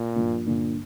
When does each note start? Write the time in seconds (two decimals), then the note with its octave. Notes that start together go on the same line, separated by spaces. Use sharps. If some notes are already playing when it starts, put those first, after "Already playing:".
Already playing: A#2
0.16 G2 F3 A#3
0.46 G2 A#2 D3 A#3